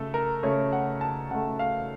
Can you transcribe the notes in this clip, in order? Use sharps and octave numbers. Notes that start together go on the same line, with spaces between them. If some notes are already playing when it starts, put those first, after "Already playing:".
Already playing: C#3 A3 A4
A#4
C#3 A3 C#5
F#5
A5
C#3 A3 F#5
F5